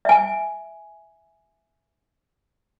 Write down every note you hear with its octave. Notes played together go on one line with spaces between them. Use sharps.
E5 G#5